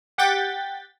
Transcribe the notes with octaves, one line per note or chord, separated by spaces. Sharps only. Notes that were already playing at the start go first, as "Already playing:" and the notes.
G4 F#5 G5 G6 A6 B6